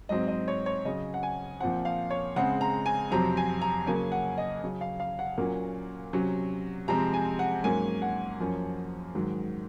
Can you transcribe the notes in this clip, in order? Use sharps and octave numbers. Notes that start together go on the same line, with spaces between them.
G#2 F#3 C4 D#5
D#5
C#5
C#5
C#3 F#3 C#4 D#5
F#5
G#5
A#2 F3 C4 F#5
F5
C#5
C#3 G#3 C4 F#5
A#5
G#5
F2 C3 F#3 C4 A#5
G#5
A#5
C#3 F#3 A#3 C#4 G#5
F#5
D#5
C#3 F#3 C#4
F5
F5
F#5
A#2 F#3 A#3 C#4
C3 F#3 C#4
C3 F3 G#3 C4 A#5
G#5
F#5
G#2 F#3 A#3 C#4 G#5
F#5
F#2 F3 A#3 C#4
G#2 D#3 F#3